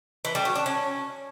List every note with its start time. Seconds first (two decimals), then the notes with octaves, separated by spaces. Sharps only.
0.25 E3
0.35 G3
0.45 F#4
0.56 D4
0.66 C#4